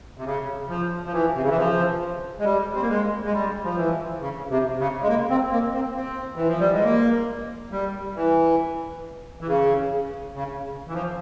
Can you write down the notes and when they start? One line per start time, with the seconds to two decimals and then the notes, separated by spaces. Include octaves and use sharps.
0.17 C3
0.25 C#3
0.68 F3
1.06 F3
1.12 E3
1.34 C3
1.42 C#3
1.49 E3
1.56 F3
2.40 G#3
2.45 G3
2.74 C4
2.81 A#3
2.88 G#3
3.25 G#3
3.33 G3
3.65 F3
3.76 E3
4.20 C#3
4.49 C3
4.79 C#3
5.03 G#3
5.08 A#3
5.30 C4
5.52 A#3
5.74 C4
5.96 C4
6.35 E3
6.47 F3
6.60 G3
6.72 G#3
6.83 A#3
7.71 G3
8.16 E3
9.41 E3
9.47 C#3
10.35 C#3
10.88 E3
10.94 F3